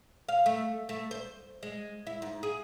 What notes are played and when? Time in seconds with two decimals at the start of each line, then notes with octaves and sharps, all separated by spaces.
0.29 F5
0.46 A3
0.89 A3
1.11 C5
1.63 G#3
2.07 E4
2.22 G#2
2.43 G#4